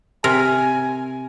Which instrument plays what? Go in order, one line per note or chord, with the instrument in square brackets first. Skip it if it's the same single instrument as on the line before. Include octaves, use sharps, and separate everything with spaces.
[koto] C3 A#4 [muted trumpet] G#5